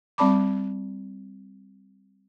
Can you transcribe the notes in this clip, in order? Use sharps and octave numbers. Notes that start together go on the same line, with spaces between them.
G3 C4 D5 A5 B5 D6